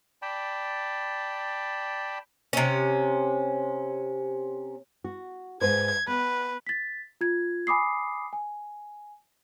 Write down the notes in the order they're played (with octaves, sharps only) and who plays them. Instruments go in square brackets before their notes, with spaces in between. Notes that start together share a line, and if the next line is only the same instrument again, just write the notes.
[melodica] D5 G5 A5 B5
[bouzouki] C3 C#4
[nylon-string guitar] F#4
[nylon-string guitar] G#2 B4 C5 [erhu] G#6
[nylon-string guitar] B3 [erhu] B4
[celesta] A6 B6
F4 G#6
G#5 B5 D6 D#6 C7
G#5